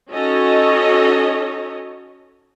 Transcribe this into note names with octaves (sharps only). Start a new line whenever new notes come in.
C#4 D#4 F#4 A4 C#5 D#5